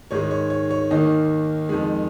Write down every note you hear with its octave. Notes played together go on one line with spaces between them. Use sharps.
G#2 D#3 G#3 C#5
C#5
C#5
C#5
D#2 D#3 A#3 D#5
F2 D#3 G#3